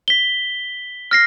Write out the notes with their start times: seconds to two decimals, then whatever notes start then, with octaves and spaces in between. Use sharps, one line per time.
0.08 B6 G7
1.11 F6 A#6 C7